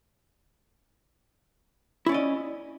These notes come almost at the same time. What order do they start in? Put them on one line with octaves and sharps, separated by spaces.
E4 C#4 D5 D#5